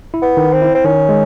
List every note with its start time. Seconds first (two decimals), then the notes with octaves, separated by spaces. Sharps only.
0.14 E4
0.22 B3
0.37 D#3
0.53 C4
0.62 E4
0.75 C4
0.85 D#3 C#4
1.09 G#3